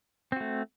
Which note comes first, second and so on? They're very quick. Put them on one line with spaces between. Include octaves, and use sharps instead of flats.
C4 F#4 A3